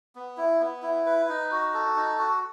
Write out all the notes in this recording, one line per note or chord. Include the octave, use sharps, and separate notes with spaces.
B3
E4
B3
E4
B4
D#4
F#4
A4
D#4
F#4